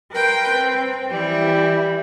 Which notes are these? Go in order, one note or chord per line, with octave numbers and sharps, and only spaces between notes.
A#4 B4 G5 C6
C4
E3 G3 E4